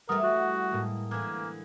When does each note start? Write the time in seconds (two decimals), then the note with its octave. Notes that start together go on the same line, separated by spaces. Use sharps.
0.09 E3 G3 A3 A#4 F#5 D#6
0.24 F#4
0.71 A2 G#3 A#3
1.11 D3 E3 A#3 F#6 G#6